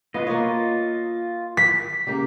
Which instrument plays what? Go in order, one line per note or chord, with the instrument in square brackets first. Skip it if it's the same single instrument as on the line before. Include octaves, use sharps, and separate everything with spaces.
[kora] B3 F#4 B4 [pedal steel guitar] F4 D#5
[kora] A#3 C#5
[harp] B6
[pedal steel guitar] C#3 [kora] A#3 G4